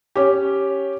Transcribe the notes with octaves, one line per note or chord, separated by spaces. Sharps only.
C#4 G4